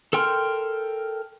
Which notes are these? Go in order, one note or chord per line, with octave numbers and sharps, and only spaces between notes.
A4 A#4 G5 C6 F6